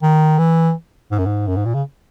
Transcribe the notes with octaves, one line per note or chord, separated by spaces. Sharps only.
D#3
E3
G#2
F#2
G#2
F#2
G#2
A#2
C#3